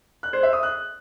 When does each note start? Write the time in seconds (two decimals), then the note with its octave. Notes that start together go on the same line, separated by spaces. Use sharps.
0.23 F#6
0.33 C5
0.43 E5
0.53 D#6
0.63 F#6